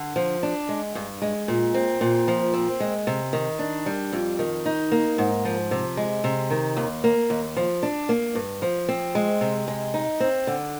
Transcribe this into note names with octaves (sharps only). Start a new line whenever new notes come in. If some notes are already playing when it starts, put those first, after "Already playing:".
Already playing: D3
F3
D4
G#3
G2
G#3
A#2
C4
A#2
F3
C4
G#3
C3
D#3
D4
G3
F2
D#3
D#4
A#3
G#2
F3
C3
G#3
C3
D#3
D#2
A#3
D#2
F3
D4
A#3
G2
F3
C4
G#3
C3
G#3
D#4
C4
D3